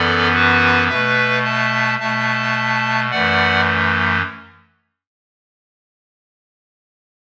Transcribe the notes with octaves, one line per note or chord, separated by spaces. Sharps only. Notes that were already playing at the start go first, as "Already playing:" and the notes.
Already playing: F#2 E3 B3 A4 D5
F#4 B4
B2 A3 B4 E5
E5 A5
B2 A3 E5 A5
F#2 E3 A3 D5 F#5